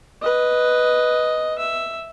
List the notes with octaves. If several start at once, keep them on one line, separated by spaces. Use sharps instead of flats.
B4 D#5
E5